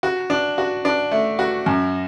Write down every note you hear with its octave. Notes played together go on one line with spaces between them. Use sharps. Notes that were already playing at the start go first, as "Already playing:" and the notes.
F#4
D4
F#4
D4
A3
F#4
F#2